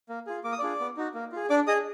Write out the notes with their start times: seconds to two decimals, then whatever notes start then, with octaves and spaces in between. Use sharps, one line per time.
0.09 A#3
0.27 F4 G#4
0.44 A#3 D6
0.52 D#6
0.59 D4 F4 G#4 D5 D6
0.80 B3
0.97 D#4 F#4
1.14 A#3
1.32 F4 G#4
1.50 D4 D5 D6
1.67 G#4 D#5 D#6